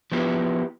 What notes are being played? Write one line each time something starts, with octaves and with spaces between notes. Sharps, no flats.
F3 B3 E4 G4